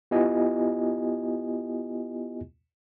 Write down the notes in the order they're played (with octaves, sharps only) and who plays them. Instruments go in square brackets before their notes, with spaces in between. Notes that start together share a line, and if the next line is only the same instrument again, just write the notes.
[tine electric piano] B3 E4 F4 G4 D#5 G#5